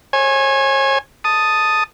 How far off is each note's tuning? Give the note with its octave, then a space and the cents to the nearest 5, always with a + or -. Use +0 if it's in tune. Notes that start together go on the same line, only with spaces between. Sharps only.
C#5 -40 G#5 +0
A5 +0 D#6 +0